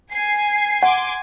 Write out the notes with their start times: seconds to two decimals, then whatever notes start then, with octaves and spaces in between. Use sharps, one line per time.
0.13 G#5 C7
0.83 F#5 G#5 C6 D6